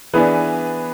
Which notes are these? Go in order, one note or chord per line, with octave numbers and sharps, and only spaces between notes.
E3 B3 D4 G#4 B4